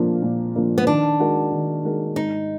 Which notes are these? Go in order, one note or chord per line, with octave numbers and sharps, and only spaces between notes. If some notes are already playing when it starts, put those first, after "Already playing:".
Already playing: A#2 F3 A#3 D4
A#2
F3 A#3 D4
B3
D#3 D4
G#3 D#4 F#4 A#4
D#3
G#3 D#4 F#4 A#4
G#2 D#4